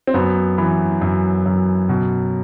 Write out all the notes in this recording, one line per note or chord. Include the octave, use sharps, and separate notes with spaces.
C4
F#2 B3
E3
F#2
F#2
B2